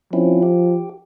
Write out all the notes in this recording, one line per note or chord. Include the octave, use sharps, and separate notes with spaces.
F3 C4 C#4 E4
G4